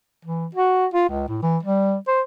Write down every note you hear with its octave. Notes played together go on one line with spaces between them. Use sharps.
E3
F#4
F4
C#2
A2
E3
G3
C5